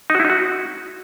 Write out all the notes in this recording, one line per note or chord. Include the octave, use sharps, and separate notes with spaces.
D#4
F#4
E4
D#4
F#4